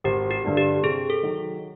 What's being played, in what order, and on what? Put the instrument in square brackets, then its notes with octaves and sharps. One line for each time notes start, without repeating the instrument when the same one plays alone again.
[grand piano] G#1 [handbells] G4
[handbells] G4
[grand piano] G2 D3
[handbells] G4
[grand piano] C3 [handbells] G#4
[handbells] A4
[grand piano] D#3 F#3